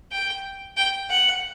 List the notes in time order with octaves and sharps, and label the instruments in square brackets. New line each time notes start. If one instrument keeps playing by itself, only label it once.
[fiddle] G5
G5
F#5